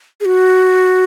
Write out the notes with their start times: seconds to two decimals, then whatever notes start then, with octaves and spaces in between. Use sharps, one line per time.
0.21 G#4
0.25 F#4